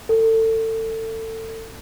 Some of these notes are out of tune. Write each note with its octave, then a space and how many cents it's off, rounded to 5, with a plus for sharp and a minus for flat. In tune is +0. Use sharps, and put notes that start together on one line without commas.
A4 +25